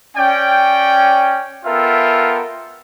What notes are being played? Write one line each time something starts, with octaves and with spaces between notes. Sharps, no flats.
C#4 D5 G5
B3 F4 A4 A#4 E5 G5